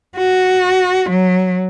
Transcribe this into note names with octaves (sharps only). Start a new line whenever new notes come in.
F#4
F#3